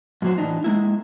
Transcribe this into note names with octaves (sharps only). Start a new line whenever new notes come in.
F#2 A#2 F#3 F#4 C5
A2 E3 D4 D#4
G#3 A#3 E4